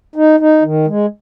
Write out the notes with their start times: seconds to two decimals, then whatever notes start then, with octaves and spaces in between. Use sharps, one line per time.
0.16 D#4
0.40 D#4
0.63 D#3
0.87 G#3